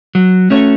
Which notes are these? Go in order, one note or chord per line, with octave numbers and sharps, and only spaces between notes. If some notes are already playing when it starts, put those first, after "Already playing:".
F#3
A3 C#4 F#4 C#5